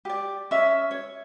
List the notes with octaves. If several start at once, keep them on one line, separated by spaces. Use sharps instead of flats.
G4 D5
C#4 E5
C#5